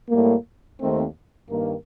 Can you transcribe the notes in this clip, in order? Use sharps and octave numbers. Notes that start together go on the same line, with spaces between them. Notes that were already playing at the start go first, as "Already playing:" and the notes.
A2 G3 A#3
D#2 D#3 A3 C4
G2 D#3 A#3